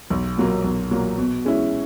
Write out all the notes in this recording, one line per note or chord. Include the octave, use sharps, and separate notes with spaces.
B1
A#2 F#3 A#3
B1
A#2 F#3 A#3
B2
G#3 C#4 E4